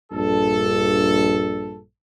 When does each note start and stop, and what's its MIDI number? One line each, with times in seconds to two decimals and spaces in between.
0.12 1.80 34
0.12 1.80 43
0.12 1.80 69